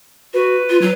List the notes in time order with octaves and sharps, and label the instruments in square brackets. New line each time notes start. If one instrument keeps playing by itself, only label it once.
[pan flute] F#4 [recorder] B4
[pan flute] F4
F#3